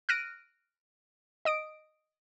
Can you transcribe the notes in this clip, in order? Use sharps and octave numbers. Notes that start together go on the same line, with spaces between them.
F6 F#6 A#6 D7 D#7
D#5 D#6 D7